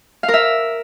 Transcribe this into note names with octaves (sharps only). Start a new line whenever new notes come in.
F5
A#4
E5